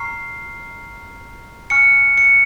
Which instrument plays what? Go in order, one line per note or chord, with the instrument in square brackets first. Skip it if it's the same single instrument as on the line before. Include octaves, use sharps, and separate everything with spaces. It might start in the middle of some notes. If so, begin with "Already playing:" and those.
Already playing: [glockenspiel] A#5 C#6 F6 C7
G#5 C#6 F6 C#7
C#7